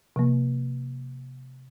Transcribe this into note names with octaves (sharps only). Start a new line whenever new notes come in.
C3 F3 A#3